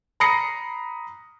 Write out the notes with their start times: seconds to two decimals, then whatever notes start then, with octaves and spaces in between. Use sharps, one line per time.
0.20 A#5 B5 D#6 A#6 C7 C#7